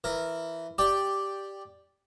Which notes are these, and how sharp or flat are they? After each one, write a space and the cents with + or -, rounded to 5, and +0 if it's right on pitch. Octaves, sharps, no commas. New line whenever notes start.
E3 +5 A#4 +0
G4 +0 D5 +0 G5 +5